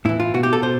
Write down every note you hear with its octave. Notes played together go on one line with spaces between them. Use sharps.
A2 E3 E4
F4
B2 F#4
G4
A4
B2 C5